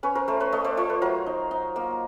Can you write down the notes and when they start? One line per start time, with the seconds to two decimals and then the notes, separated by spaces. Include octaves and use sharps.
0.03 C#4 B4 C#5
0.15 A#4 C5
0.28 A3 A#4 C5
0.40 B4 C#5
0.52 A3 C#5 D#5
0.64 C5 D5
0.77 F4 C5 D5
0.90 B4 C#5
1.02 F#3 A#4 C5
1.26 D#4
1.51 D#4
1.76 A#3